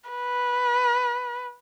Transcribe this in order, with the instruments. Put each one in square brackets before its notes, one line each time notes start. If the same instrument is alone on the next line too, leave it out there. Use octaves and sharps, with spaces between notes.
[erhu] B4